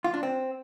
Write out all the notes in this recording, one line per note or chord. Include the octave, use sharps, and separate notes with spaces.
F4
D4
C4